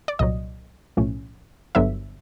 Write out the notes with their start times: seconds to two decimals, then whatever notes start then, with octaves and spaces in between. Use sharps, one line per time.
0.08 D5
0.19 C2 A#2 F#3 D#5
0.97 B1 A2 F3 A3 C#4
1.75 G1 G2 D3 F#3 B3 E5